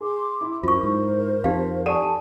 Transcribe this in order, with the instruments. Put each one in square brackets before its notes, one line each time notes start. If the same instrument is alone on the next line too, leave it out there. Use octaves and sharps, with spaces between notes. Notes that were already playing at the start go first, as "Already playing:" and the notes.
[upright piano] G#4 [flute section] C6 D6
[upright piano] E4
[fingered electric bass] F#2 [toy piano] F4 C#6 [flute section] A#4 C5
[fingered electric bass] G#2
[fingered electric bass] F2 [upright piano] C4 [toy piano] D#4 G4 F5
[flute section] G4 A5 [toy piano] A4 D5 F#5 [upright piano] G#5 C#6 D#7